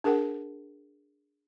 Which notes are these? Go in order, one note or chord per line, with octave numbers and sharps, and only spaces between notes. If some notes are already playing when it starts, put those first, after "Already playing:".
D4 G#4 A#4 F#5 G5